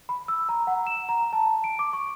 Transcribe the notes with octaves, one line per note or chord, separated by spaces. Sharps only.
B5
E6
A#5
F#5
E7
A#5
A5
D7
D6
C#6